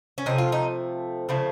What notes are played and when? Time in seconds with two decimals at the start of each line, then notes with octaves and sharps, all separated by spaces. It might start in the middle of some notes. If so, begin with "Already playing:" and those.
0.18 C#4
0.26 C3 F3 A3 D#4
0.38 F4
0.52 D#4
1.29 C#3 F3 A3